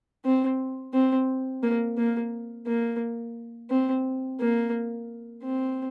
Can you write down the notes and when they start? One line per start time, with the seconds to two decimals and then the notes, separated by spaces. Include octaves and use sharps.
0.25 C4
0.93 C4
1.63 A#3
1.97 A#3
2.67 A#3
3.70 C4
4.40 A#3
5.43 C4